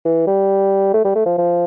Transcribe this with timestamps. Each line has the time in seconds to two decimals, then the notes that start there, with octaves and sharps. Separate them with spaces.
0.05 E3
0.27 G3
0.94 A3
1.05 G3
1.15 A3
1.26 F3
1.38 F3